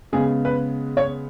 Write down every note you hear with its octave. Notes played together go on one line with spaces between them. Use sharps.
C#3 G#3 B3 G#4
B4
C#5